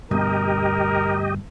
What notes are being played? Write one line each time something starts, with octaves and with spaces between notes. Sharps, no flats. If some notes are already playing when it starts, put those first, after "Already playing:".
D2 G2 B2 G4 A#4 D#5